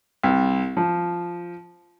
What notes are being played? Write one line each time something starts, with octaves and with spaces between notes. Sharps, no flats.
C2
F3